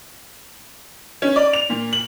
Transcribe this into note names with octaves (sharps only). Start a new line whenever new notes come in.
C#4
D5
F7
A#2
F#7